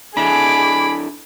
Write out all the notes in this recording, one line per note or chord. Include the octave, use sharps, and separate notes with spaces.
D4 E4 G#4 A4 B5 D6